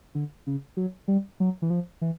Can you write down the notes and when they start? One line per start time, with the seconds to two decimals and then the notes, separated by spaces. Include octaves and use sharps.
0.15 D3
0.47 C#3
0.77 F#3
1.08 G3
1.40 F#3
1.62 E3
1.70 F3
2.01 E3